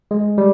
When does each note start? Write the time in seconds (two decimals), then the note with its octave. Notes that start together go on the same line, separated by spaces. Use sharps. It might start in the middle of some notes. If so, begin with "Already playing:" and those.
0.11 G#3
0.38 G3